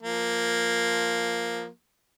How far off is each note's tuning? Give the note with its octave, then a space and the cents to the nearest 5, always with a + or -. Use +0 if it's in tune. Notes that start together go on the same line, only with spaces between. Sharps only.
F3 +0 A#3 +0